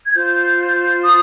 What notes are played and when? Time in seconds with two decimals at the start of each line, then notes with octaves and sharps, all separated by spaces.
0.06 G#6
0.14 F4 C5 G6
1.03 D#6